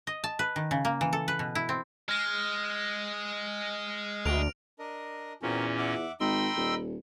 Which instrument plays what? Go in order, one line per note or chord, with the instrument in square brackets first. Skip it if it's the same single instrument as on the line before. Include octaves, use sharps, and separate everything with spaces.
[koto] D#5
A5
B4
D#3
C#3
A#3
E3
A4
B4
B2
E4
C4
[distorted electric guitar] G#3 [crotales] F6 A#6
[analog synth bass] D2 [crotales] D7 F7
[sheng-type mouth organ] D4 A#4 D#5
[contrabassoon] E2 [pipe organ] A#2 C#4 [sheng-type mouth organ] C4 F#4 A#4
[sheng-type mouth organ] E5 F#5 D6
[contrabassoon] G#1 [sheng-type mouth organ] D#4 D#5 B5 [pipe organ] G5 C6 E6
[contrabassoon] D#1